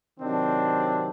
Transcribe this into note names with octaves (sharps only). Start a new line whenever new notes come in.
C3 D#3 F#3 C4 D4